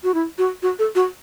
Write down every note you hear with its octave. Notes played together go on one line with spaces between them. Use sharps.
F#4
E4
F#4
F#4
A4
F#4